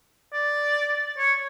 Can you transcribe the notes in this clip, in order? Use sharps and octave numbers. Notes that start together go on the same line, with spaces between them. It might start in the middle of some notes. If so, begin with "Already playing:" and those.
D5
C#5